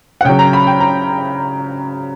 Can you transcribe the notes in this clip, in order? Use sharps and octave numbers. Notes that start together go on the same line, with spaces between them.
F#5
C#3 F#3 G5
A#5
B5
G5
A#5